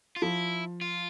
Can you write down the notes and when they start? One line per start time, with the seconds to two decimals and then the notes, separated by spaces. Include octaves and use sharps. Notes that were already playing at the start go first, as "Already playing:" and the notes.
0.16 F4
0.22 F3 E4
0.81 F4